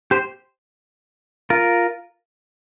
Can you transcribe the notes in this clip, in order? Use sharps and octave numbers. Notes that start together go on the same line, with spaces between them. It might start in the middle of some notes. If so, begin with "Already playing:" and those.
G4 C5
F4 A#4